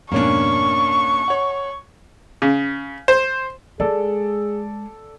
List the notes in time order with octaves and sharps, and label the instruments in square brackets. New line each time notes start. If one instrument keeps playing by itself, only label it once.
[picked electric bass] F2 G#2 B2 [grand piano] A#3 C#4 D4 [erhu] C#6
[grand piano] C#5 F#5
[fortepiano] C#3
C5
[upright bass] G#3 [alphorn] G#4 [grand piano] A4 D5